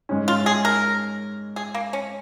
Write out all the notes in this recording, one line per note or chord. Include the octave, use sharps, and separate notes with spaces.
G#2 G#3 C#4
F4
G#4
A#4
G#4
A#3
C#4